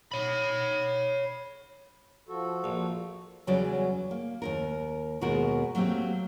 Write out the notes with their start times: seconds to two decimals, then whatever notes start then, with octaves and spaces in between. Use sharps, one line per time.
0.12 C#5 B5
2.29 F3 F#4 A4
2.64 A#1
3.47 E2 C#3 F#3 G3 F#4 D5
4.11 A#3
4.42 D#2 G#2 A#4
5.21 D#2 B2 G#3 F#4 A#4
5.75 F#3 A3 A#3 C4 G4